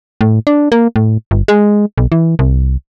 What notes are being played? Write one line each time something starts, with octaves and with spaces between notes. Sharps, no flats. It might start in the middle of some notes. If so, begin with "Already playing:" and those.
A2
D4
A#3
A2
G1
G#3
B1
E3
C2